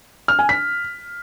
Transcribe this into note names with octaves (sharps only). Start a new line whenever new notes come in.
F6
G#5
B6